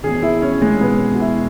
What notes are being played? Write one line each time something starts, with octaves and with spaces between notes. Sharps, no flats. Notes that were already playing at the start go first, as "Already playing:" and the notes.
E1 E2 B2 G#4
E4
C#4
G#3
E1 E2 B2 B3
F#4
E4